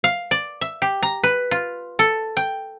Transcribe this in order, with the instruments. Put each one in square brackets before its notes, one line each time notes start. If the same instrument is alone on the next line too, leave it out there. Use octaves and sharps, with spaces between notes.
[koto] F5
D5
E5
G4
A#5
B4
F4
A4
G5